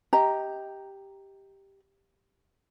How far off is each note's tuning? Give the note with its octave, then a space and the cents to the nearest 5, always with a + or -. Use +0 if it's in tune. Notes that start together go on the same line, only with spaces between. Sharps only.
G4 +0 D#5 +20 A#5 -5